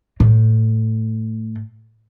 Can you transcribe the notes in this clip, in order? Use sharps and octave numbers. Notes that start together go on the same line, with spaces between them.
A2